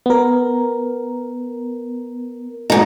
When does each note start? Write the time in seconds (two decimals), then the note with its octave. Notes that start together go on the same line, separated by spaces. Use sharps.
0.06 B3 A#4
2.70 G#2 D#4